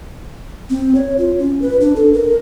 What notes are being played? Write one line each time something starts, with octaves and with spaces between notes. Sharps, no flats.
C4
C#5
F4
C#4
B4
D4
A4
A#4